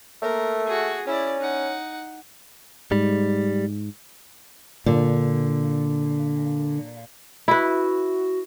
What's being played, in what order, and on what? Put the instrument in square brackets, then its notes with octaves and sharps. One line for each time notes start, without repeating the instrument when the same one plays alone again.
[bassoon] A3 [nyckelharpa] A#3 A#4
[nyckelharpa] F#4 G#4
[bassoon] C#4 [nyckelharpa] E4 D5
[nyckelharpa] D#4 F#5
[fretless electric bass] G#2 [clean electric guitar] G3
[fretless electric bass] A#2 [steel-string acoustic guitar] D3
[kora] E4 B4 [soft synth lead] F#4